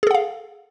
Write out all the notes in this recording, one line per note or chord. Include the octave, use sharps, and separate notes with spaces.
G#4 A4 F5 F#5